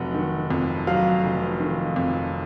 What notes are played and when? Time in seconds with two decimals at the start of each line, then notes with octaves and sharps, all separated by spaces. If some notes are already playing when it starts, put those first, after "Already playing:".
Already playing: F1 F#3 F#5
0.14 D#3
0.50 F2
0.87 F#3 F5
1.24 F1
1.60 D#3
1.96 F2